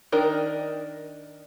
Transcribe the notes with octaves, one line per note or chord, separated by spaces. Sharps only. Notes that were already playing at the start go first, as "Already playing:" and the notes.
D#3 D4 D#4 A#4